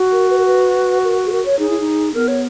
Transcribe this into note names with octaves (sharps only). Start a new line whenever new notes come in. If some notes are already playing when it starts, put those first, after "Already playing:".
Already playing: F#4
A#4
B4
A#4
B4
A#4
G#4
A#4
C#5
D#4 G#4
E4
D#4
B3 A#4
C#5